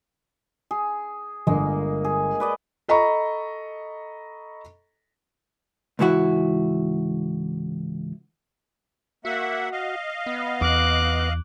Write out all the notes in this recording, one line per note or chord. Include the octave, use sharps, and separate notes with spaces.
G#4
G1 G#3 A#3
G#4
B4 D5 D#5
A4 D#5 A#5 B5 C#6
C#2 G#2 E3 E4 F#4
A#3 F#4 E5 F#5
D#5 F5
B3
E2 D6 F#6